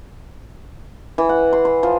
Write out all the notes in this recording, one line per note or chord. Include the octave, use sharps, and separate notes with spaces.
E3
F#5
C6
C6
F3